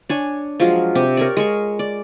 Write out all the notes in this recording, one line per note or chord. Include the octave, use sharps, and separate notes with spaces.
D4 C#5 G#5
F3 F#3 G#3 F4
C3 G4
A#4 C#5 D5
G#3 C#6
D5